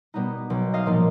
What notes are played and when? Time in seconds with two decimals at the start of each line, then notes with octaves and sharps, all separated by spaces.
0.14 B2 G3 B3 D#4
0.50 B1
0.74 D#5 F5
0.86 A#2 F3 A#3 D#4